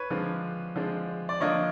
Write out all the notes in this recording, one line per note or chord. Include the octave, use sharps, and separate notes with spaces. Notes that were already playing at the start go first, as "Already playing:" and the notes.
Already playing: B4 C#5
D3 F3 G#3 C4
D3 F3 G#3 C4
D5
D3 F3 A#3 D4 C#5 D#5